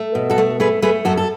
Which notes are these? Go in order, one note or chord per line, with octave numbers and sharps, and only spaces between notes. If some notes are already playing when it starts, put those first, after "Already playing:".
Already playing: A3
B2
F#4 A4
A3
A3 G#4 B4
A3 G#4 B4
F#2 F#4 A4
A4